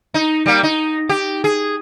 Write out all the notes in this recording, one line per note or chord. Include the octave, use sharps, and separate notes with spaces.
D#4
G3 A#3
D#4
G4
G#4